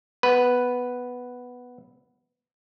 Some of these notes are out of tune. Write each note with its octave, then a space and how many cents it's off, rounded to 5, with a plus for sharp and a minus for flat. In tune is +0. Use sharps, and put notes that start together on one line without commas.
B3 +0 B4 +0